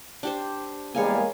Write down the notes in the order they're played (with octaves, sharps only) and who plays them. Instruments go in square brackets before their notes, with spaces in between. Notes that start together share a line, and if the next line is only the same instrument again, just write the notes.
[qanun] D4 G4 C5
[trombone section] E2 G3 G#4 [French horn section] G#3 A#3 [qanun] C#5 F5 G#5